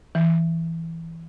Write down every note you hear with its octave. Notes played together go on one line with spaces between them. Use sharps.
E3